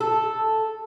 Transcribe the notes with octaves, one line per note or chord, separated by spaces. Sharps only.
A4